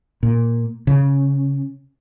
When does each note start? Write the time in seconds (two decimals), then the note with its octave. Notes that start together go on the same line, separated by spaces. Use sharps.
0.23 A#2
0.87 C#3